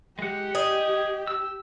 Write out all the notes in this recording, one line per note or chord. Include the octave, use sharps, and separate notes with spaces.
G#3 G4 F#5
G#4 D#5
E6